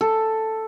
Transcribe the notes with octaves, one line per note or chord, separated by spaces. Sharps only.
A4